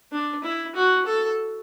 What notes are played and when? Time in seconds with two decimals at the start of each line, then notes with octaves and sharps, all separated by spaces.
0.12 D4
0.43 E4
0.75 F#4
1.05 A4